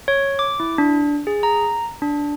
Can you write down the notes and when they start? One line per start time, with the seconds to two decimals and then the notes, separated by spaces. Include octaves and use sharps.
0.08 C#5
0.39 D6
0.60 E4
0.78 D4
1.27 G#4
1.43 A#5
2.02 D4